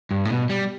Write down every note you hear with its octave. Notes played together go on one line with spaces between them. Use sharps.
G2
A2
B2
G3